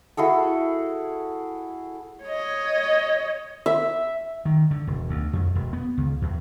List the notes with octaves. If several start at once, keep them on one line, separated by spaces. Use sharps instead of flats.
E4 F#4 G#4 A4
C#5 D#5
E5
D#3
D3
E1
D2
F2
E1
B3
C#2
E2